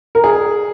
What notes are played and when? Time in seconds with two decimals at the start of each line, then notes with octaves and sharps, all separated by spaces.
0.15 A#4
0.24 G#4